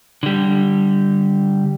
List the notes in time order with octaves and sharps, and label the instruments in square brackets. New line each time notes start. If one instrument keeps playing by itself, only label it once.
[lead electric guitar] D3 G3